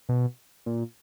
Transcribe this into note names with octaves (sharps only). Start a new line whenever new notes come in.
B2
A#2